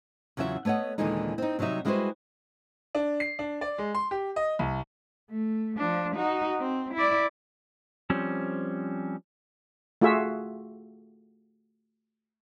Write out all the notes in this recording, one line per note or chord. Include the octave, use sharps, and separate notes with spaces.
E2 C#3 F#3 F4 E5 F#5
A3 B3 C#5 D#5 F#5
D#2 A#2 D3 E3 G#3 D#4
C4 D#4
C3 F#3 G3 D#4 E5
G3 G#3 E4 F#4 B4 C5
D4
C7
D4
D5
G#3
C6
G4
D#5
C2
A3
F3 D4
D#4 F#4
C4
E4 D5
F3 G3 C4 C#4
A3 F4 F#4 G#4 E5